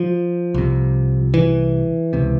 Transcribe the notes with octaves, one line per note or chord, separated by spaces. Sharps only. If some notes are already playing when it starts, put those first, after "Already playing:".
Already playing: F3
C2 C3
E3
C#2 C3